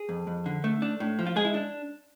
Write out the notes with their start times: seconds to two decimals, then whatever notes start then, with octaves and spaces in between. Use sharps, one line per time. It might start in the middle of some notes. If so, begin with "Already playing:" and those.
Already playing: G#4
0.09 F2
0.27 F2
0.46 D3
0.64 A3
0.82 D4
1.00 A2
1.19 F3
1.27 F4
1.36 G#3 G#4
1.45 E4
1.54 D4